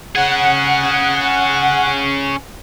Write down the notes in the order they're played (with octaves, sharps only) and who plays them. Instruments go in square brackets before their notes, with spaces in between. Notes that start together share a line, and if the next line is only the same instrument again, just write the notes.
[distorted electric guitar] C#4 G#4 [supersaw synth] F#5